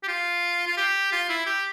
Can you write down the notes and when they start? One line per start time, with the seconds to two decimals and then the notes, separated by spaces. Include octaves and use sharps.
0.03 G4
0.08 F4
0.66 F4
0.77 G4
1.12 F4
1.29 E4
1.46 G4